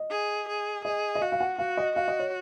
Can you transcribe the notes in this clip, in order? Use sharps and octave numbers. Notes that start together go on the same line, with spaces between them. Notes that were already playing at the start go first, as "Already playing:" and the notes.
Already playing: D#5
G#4
G#4
G#4 D#5
D#5
F#4 F5
F5
F#5
F#4 F5
D#5
F#4 F5
D#5
C#5